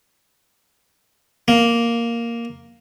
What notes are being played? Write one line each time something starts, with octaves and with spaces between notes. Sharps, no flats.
A#3